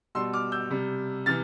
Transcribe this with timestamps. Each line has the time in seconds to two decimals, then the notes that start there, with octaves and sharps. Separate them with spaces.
0.15 B2 G3 C6 E6
0.33 D6 F6
0.52 E6 G6
0.71 C3 G3
1.26 C3 E3 F6 A6